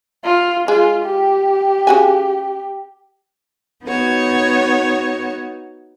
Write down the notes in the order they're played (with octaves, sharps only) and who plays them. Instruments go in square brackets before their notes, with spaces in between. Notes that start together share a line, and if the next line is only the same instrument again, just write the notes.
[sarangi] F4
[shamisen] G#3 [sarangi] F4
[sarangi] G4
[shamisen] C#3 F#4 G#5
[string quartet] B3 D#4 F#4 C#5